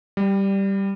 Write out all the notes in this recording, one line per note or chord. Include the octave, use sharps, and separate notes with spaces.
G3